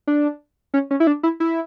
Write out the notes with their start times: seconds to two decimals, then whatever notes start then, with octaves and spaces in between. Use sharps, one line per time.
0.07 D4
0.74 C#4
0.91 C#4
1.00 E4
1.07 D4
1.23 E4
1.40 E4